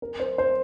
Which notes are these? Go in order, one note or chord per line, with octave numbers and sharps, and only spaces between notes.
A#4
C5
C5